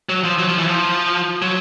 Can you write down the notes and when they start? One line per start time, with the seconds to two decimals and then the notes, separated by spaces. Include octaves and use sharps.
0.09 F#3
0.24 F3
0.38 F#3
0.48 F3
0.58 E3
0.68 F3
1.42 F#3